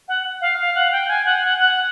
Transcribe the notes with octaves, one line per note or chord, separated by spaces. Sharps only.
F#5
F5
F5
F#5
G5
G#5
F#5
F#5
F#5